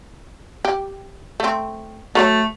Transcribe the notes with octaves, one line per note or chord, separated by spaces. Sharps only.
G4
A3 C4
F#3 A3 A#4 C#5